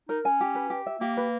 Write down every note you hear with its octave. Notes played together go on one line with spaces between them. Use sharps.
D#4 A#4
C#4 G#5
G4
B4
G4
E5
A#3 G4
B4